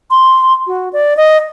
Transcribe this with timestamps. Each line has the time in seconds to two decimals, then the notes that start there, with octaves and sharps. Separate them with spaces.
0.11 C6
0.67 F#4
0.93 D5
1.17 D#5